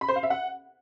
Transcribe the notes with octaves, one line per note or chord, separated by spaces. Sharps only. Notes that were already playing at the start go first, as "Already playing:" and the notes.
B5
C5
F5
E5
F#5